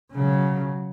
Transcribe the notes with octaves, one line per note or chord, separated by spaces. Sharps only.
C#3 F#3